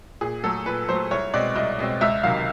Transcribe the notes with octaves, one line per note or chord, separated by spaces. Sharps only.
A#2 G#4
F#3 A3 A4
A#2 B4
F#3 A3 C5
C2 C#5
B2 G#3 C4 D5
C2 D#5
B2 G#3 C4
C#2 E5
C3 D#3 F#3 F5